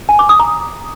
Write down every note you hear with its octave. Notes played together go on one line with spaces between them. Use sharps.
G#5
D6
D#6
A#5